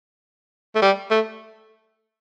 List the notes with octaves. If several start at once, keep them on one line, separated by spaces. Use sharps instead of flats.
A3
G3
A3